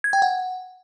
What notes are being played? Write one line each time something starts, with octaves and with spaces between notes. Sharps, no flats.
G#6
G5
F#5